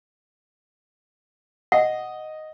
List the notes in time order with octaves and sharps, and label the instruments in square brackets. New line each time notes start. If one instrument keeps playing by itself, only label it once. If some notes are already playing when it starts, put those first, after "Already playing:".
[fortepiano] D#5 [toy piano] F#5